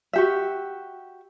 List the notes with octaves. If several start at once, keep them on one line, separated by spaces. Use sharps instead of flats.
F#4 G4 E5